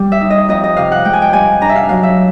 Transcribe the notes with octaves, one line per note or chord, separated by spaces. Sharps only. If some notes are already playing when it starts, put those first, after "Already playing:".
Already playing: G3
E5
D#4
D#5
F2 D#5
D#5
C3 F5
F#5
G#3 G5
G#5
G5
G2 G#5
D4 A#5
E5
F5
F#3 F5
E5